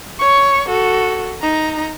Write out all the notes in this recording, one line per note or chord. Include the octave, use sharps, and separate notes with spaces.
C#5 C#6
F#4 A4
D#4 A#5